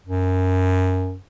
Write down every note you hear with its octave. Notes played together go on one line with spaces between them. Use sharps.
F#2